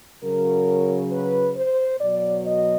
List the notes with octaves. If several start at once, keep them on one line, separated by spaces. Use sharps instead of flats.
C#3 F#3 A#4
B4
C5
B2 F#3 D5
D#5